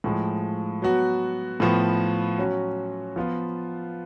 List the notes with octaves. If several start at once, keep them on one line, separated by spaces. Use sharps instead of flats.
A2 F3 G#3
F#3 B3 F#4
A2 F3 B3
F#3 C#4 F#4
F3 B3 F4